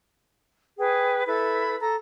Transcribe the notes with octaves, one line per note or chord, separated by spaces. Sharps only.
G#4 B4 G5
E4 A4 B4 B5
A4 A#5